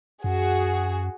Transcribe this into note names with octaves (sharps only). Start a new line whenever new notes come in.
F#2 F#4 G#4